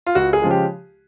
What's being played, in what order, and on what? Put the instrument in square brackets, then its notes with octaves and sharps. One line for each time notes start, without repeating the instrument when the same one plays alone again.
[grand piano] F4
C#2 F#4
G#4
C#3 F3 G#3
G4